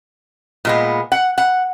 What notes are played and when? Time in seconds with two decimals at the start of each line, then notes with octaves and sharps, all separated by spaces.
0.65 A#2 G#3 B3
1.12 F#5
1.38 F#5